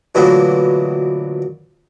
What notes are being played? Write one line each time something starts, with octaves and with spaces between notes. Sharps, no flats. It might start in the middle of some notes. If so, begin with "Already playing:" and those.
D2 A#2 E3 F#3 G#3 B3